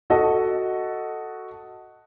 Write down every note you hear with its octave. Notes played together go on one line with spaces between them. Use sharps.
F#4 A4 D#5 A5